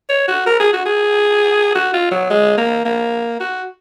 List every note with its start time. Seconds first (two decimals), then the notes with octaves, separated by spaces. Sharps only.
0.09 C#5
0.28 F#4
0.46 A#4
0.60 G#4
0.73 F#4
0.85 G#4
1.75 F#4
1.93 F4
2.11 F#3
2.30 G#3
2.57 A#3
2.85 A#3
3.40 F#4